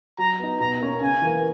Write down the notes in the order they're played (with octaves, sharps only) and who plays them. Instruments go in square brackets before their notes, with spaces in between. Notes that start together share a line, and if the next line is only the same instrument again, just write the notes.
[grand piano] F#3 [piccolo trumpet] A#5
[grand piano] B3 D#4
[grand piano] B2 [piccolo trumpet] A#5
[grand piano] A#3 C#4
[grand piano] C#3 [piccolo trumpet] G#5
[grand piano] E3 A#3